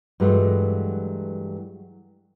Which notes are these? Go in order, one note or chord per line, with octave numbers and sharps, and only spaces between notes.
G2 E3 F#3 G#3 A3